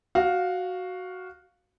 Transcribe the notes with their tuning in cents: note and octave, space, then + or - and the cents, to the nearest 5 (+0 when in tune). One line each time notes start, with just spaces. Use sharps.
F#4 +0 F5 +10